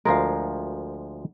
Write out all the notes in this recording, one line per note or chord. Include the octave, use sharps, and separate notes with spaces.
D2 F3 G#3 A#4 F5